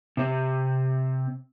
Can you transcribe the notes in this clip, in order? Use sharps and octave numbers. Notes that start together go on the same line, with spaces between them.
C3 C4